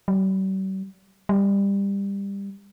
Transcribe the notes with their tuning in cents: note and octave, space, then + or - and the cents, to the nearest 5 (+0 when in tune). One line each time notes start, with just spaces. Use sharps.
G3 -45
G3 +20